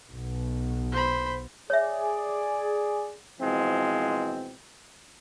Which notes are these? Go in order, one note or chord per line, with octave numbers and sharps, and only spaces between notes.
B1 B2
C5 B5
G#4 C#5 D5 E5
B2 E3 F3 G#3 C4